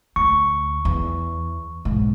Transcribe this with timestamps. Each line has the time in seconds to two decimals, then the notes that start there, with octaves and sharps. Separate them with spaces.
0.16 D2 C#6
0.85 E2
1.85 B1 G#2